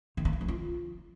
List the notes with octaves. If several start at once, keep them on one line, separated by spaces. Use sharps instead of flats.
D#3
A#3
A3
F3
F4